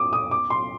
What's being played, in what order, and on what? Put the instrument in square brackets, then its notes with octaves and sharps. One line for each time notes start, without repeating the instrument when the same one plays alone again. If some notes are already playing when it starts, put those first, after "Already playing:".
Already playing: [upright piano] D6 D#6
D#6
D6
C6